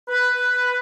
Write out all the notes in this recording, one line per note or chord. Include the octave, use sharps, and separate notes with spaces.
B4